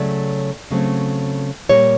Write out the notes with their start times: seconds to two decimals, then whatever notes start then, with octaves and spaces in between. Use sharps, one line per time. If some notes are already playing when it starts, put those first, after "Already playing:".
Already playing: C#3 F#3 A3 D5
0.71 C#3 F#3 A3 C4
1.69 A#2 G3 A#3 C#5